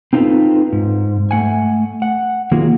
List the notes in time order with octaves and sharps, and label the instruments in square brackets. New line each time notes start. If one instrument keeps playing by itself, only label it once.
[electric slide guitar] C4 D#4 F4 G#4 A4 B4
G#2
A3 F#5 G#5
F#5
D#3 F#3 A#3 F4 F#4 G#4